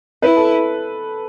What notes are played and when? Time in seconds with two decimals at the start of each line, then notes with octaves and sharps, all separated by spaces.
0.22 E4 B4
0.37 A4